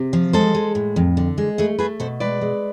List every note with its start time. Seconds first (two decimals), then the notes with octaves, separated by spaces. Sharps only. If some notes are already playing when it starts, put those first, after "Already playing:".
Already playing: C3
0.13 F3
0.33 G#3 A4 C5
0.55 G#3
0.75 A2
0.96 F2
1.17 D3
1.38 G#3
1.58 A3 G#4 B4
1.79 A3 G#4 B4
2.00 B2 A4 C5
2.20 G#3 B4 D5
2.41 G#3